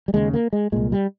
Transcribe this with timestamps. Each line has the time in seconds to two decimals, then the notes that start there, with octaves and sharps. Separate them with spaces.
0.08 G3
0.14 D#2 C#3 G#3
0.34 A#3
0.53 G#3
0.72 C2 A#2 G#3
0.92 G3